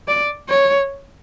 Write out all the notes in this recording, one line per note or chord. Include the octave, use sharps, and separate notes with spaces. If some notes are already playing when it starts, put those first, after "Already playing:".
D5
C#5